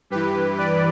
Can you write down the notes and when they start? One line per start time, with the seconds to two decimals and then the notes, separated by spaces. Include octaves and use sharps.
0.10 G2 E3 G4 B4
0.58 B4 D5